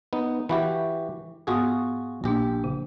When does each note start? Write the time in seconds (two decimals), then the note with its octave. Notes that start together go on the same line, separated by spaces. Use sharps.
0.13 B3 D#4
0.49 E3 F#4 G4 E5 F5 B5
1.47 G#2 B3 F4 F#4 G#4 D#6
2.24 A#1 A#3 D4 G4
2.64 C#3